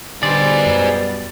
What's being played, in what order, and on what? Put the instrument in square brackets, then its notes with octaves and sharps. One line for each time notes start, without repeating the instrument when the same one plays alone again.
[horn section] B2 G3 [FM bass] D3 [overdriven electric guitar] G#4 C5 [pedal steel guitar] D5
[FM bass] F#2